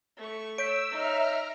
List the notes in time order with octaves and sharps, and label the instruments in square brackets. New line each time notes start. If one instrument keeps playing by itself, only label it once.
[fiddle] A3 C#6
[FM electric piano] C#5 G6 B6 [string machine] E6 [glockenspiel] D7
[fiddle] D#4 [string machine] E5 A#5 F6